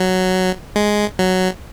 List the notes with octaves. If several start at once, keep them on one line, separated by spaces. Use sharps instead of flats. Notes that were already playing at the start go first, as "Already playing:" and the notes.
Already playing: F#3
G#3
F#3